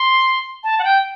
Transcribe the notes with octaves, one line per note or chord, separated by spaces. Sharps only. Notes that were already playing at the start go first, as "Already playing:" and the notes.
Already playing: C6
A5
F#5
G5